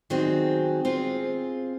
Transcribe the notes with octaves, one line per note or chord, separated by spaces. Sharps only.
D#3 F#3 G3 C4 F#4 G#4
C4 F4 G#4